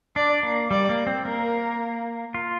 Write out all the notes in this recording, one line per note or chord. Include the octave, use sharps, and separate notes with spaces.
D4 D5
A#3
G3 D5
A#3
C4
A#3 A#4
F4